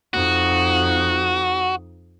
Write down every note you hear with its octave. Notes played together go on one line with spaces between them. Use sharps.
F2 D#4 F#4